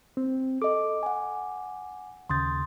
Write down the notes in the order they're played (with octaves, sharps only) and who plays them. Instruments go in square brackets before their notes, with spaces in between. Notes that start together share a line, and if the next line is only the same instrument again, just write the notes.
[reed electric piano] C4
[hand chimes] A4 D#5 [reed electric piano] D6
[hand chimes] F#5 G#5
[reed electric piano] D#2 C#3 A6 [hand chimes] C6 D#6 G6